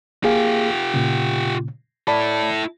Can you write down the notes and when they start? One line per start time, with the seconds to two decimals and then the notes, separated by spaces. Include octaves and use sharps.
0.24 A#3 F4 G4 G#4 F5
0.94 A#2 C#3
2.07 E4 A4 D5 A5 B5